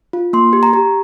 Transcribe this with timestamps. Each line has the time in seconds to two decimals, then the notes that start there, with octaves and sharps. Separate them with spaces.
0.13 F4
0.33 A#3 C6
0.53 G4
0.63 A#5
0.73 G4